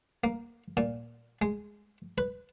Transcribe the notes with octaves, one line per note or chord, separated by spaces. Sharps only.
A#3
A#2
G#3
B4